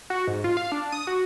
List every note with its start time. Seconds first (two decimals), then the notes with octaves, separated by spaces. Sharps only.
0.10 F#4
0.27 G#2
0.44 F4
0.57 F5
0.72 D4
0.92 D#6
1.07 F#4